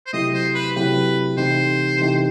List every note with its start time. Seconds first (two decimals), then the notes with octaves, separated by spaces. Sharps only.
0.06 C5
0.13 C3 F#3 A3 E4 G4 D#5
0.34 C5
0.55 B4
0.76 C3 F#3 A3 E4 G4 B4
1.37 C3 E3 A3 D#4 G4 C5
1.99 C3 E3 A3 D#4 G4